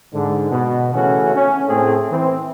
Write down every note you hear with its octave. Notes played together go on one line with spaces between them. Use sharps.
G#2 D3
B2
C#3 E3 A3 C#4 F#4
C#4
A2 A3 C4 G#4
E3 C4